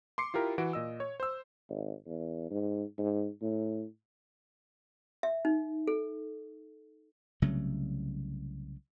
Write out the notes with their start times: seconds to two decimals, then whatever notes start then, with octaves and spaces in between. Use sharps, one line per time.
0.18 C6 D6 C7 C#7
0.34 E4 F4 G4 A#4
0.58 E3 F#4 D7
0.73 A#2 D#5 E6
1.00 C#5
1.20 C5 E6
1.69 G#1
2.07 E2
2.51 G#2
2.98 G#2
3.42 A2
5.23 E5
5.45 D#4
5.87 A4
7.42 C2 C#3 F#3 A3